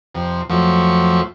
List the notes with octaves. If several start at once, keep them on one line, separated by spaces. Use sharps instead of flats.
F2 C3
F2 F3 F#3 A3 C#6